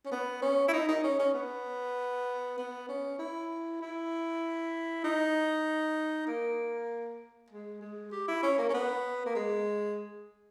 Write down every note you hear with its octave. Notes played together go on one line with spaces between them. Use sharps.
C#4
B3
C#4
E4
D#4
D#4
C#4
C#4
B3
B3
C#4
E4
E4
D#4
A#3
G#3
G#3
G4
E4
C#4
A#3
C#4
B3
A#3
G#3